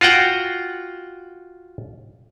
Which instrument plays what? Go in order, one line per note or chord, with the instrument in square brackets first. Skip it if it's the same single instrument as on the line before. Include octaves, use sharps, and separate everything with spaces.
[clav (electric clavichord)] F4 F#4 F#5 G5